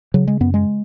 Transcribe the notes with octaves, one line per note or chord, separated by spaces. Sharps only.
C#3 F#3
G#3
F#2 B3
G#3